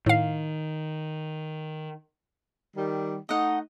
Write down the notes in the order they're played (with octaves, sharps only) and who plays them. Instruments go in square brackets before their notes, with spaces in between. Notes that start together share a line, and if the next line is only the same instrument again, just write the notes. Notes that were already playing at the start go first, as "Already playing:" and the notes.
[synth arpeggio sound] A2 F5 [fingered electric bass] D#3
[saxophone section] D#3 G3
[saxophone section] A3 D#4 [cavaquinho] D#5 F#5